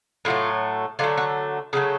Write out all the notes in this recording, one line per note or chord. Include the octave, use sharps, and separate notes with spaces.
A2 F#3 A3 F4
D3 F#3 A3 F4
F#4
C#3 F#3 A3